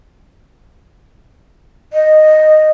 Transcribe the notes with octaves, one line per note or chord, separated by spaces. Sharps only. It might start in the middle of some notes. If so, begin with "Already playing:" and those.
D#5